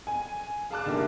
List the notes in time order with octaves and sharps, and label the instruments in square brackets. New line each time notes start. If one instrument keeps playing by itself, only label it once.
[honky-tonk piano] G#5
G#4 F5 A5 D6 F#6
D3 D#3 G3 A#3 E4